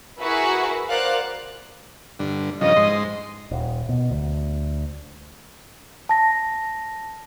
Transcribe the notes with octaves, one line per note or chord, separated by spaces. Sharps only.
E4 F#4 G#4 A#4 B4 E5
A#4 C5 D5 F5 F#5 F#6
G2 D3
G2 C#3 F3 D#5
G#2 C6
D#1
B2
D2
A5 A#6